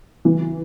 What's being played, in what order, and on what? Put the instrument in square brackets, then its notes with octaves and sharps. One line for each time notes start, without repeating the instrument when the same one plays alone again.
[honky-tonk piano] E3